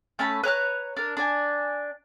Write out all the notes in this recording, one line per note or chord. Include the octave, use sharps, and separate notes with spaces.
A3 C#4 A5 B5
B4 C#5 A#5 F#6
D4 A#4
D4 D5 G#5